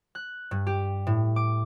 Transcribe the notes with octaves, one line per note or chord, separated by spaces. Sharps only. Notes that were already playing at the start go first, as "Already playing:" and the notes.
F#6
G2
G4
A2
D6